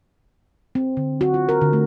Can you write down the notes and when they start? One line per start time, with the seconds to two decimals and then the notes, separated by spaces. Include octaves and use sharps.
0.75 C4
0.97 D3
1.21 F#4
1.34 F4
1.49 A#4
1.61 D3
1.73 A3